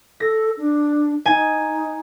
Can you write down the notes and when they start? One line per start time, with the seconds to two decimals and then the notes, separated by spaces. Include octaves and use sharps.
0.20 A4 A#6
0.57 D4
1.26 D#4 G#5